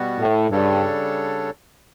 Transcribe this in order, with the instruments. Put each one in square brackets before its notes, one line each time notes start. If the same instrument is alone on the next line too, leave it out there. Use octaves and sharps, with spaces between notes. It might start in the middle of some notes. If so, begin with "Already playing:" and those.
Already playing: [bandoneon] B2 G3 B3 F#4
[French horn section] A2
[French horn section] G2 [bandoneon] C#3 G3 D4 A4 C#5